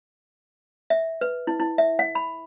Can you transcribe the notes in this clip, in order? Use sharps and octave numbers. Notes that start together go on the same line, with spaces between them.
E5
B4
E4
E4
E5
F#5
B5